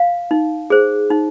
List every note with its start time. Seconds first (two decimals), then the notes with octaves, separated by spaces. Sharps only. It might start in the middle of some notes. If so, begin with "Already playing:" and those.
Already playing: F5
0.31 D#4
0.70 G#4 C5
1.10 D#4